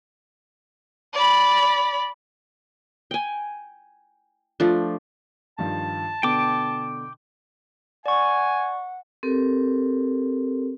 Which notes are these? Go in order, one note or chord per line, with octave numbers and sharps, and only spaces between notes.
D5 B5
G5 G#5
F3 A3 D4
G2 D#3 F3 A5
B2 D3 B3 G5 D6
D5 F#5 G#5 C#6
C4 G4 A4 A#4